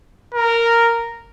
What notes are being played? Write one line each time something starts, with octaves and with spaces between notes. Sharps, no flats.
A#4